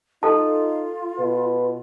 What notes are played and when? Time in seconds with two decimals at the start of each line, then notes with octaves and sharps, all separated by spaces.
0.23 D#4 F4 A4 A5
1.19 B2 B4